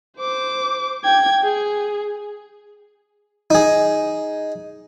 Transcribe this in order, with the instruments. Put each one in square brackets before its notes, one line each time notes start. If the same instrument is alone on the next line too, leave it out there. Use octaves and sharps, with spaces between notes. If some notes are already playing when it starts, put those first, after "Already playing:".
[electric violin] C5 D6
G5 G#6
G#4
[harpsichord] D#4 G#4